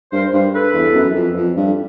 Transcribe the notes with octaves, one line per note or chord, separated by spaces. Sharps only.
G2 A#4 C5
G2
A4 B4
E2
F#2
F2
F2
G2